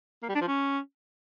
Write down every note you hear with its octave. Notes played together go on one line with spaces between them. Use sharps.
A#3
G3
D4
F3
C#4